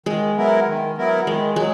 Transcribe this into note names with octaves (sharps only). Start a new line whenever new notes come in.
D#3 G#3
F#3 B3 E4 A#4
D#3
F#3 B3 E4 A#4
D#3 G#3
F#3 G#3